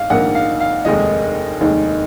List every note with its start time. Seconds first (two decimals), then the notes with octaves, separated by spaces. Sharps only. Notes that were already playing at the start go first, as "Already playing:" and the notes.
Already playing: G#2 F5
0.10 A#1 G#2 D#3 A#3 F#5
0.35 F5
0.60 F5
0.85 F1 D#2 D#3 G#3 D#4 D#5
1.60 F1 D#2 D#3 G#3 D#4